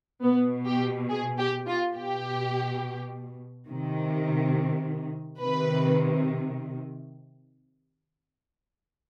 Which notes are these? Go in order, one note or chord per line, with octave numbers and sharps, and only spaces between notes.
B2 B3
G4
G#4
G4
F4
B2 G4
C3 D#3
C3 D#3 B4